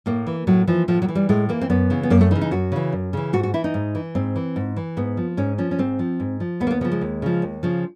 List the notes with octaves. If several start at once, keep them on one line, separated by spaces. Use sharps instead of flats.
A2 A#3
E3
A2 F#3
E3 F3
A2 F3
F#3
E3
G3
A2 G#3
E3 A#3
C4
F#2 B3
C#3 E3
B3
F#2 A#3
A3
C#3 E3 D#4
D#4
F#2 F#4
C#3 E3
F#2
C#3 E3
G#2 F#4
F#4
E3 E4
D#4
G#2
E3
G#2 C4
E3
G#2
E3
G#2 B3
F3
G#2 C#4
F3 C#4
C#4
G#2 C4
F3
G#2
F3
D#2 B3
A#3
B3
C#3 F3 B3
G#3
D#2
C#3 F3
D#2
C#3 F3